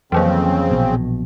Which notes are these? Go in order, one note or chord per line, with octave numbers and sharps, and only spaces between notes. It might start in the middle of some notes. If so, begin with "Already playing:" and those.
F2 C#3 E3 F#3 A#3 C4
A#1 B2